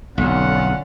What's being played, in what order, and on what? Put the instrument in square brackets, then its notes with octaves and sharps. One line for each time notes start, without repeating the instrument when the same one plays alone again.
[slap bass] B1 F2 [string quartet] D3 C#4 [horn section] A3 F4 F#5